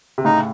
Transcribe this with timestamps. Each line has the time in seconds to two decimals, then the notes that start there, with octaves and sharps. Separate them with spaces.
0.18 C3
0.24 A2 C#3 D#4